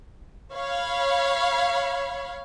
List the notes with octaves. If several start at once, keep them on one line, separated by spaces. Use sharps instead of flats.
C#5 F5 B5